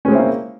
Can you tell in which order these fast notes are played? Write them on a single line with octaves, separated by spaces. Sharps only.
C#4 G#3 C4 E4 A#3